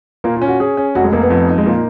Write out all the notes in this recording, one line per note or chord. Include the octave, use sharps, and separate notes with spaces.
A#2 A#3
F4
C#4
F#4
C#4 G#4
C#4
F1 F#4
G#3
F1 A#3
B3
F2
D#4
G#3
A#2 A#3